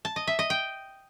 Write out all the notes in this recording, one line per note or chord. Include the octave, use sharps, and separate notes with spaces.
A5
D#5
E5
D#5
G5